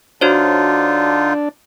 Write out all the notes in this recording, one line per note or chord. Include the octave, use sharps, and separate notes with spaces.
D3 D4 D#4 F4 F#4 C5 C#5